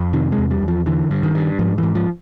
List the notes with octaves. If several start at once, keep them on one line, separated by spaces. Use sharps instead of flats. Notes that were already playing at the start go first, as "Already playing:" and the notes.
Already playing: F2
C3 D#3
G#3
E2
G3
E2
F3
D3 E3
G2
D#3
G2
G#2 F3
G#2 E3
F3